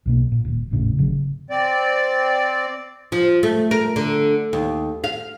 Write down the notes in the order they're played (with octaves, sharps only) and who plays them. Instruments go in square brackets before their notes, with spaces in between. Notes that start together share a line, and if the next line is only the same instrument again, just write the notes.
[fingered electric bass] B1 B2 A#3
A#2
D#1 D#2
G#1 E2 A2 C#3
G#1 C#3 F#3
[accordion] C4 D5
[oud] F3
A3
A#4
D3
D#2
F5